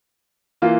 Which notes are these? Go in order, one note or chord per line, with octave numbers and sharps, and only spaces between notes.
E3 A#3 F4